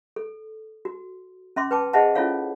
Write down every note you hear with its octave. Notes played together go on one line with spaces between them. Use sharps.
A4
F#4
C#4 E5 C6 D6
B4 G5 A5 D6
G#4 C5 D#5 E5 F#5 A5
C#4 E4 F4 A4 C#5 F5